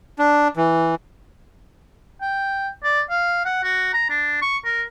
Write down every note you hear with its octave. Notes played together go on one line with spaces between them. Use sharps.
D4
E3
G5
D5
F5
F#5
F#4
A#5
D4
C#6
A#4